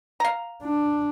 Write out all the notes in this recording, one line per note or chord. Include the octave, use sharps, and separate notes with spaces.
F5 A#5
D4